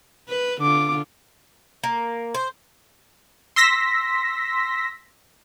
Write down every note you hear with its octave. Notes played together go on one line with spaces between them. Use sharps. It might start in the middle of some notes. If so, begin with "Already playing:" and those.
B4
D3 F4 D6
A#3
C5
C6 E6 A#6 B6